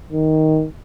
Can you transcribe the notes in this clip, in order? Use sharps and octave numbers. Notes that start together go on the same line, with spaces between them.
D#3